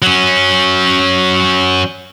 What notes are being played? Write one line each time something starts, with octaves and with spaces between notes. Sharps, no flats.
F#3 C#4